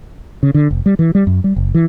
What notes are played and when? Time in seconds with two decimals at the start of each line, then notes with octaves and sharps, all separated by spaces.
0.43 C#3
0.54 D3
0.71 F1
0.86 G3
0.99 E3
1.15 G3
1.27 F#2
1.44 G3
1.56 F#1
1.75 E3